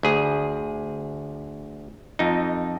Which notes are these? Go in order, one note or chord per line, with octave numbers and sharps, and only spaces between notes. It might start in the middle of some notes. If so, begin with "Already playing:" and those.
D2 G#4
F2 D#4